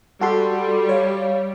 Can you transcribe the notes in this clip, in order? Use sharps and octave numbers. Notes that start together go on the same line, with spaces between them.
G3 F#4 A4 C6
C#5 F5